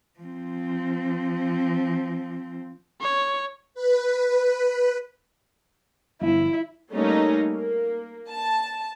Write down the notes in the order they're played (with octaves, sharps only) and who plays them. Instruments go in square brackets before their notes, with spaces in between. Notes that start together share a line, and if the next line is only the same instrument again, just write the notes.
[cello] F3 C4
[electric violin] C#5
[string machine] B4
[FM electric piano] G1 F3 [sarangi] E4
[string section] G3 A3 A#3 C#4 D#4
A#3
A5